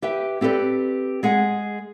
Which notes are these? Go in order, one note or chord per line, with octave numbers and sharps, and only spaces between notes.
G4 B4 E5 G5
C4 G4 A4 B4 D5
G#3 G#4 F#5 G#5